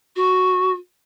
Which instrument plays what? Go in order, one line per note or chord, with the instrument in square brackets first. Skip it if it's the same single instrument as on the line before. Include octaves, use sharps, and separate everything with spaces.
[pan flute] F#4